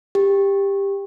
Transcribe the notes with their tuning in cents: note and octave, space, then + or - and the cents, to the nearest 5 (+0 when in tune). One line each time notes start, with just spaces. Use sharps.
G4 +15